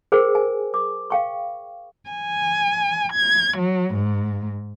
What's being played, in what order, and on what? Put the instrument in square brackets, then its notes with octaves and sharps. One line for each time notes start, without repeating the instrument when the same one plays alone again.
[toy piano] G#4 A#4 C5 G5
G#5
D6
F5 G5 C#6
[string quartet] G#5
G#6
F#3
G#2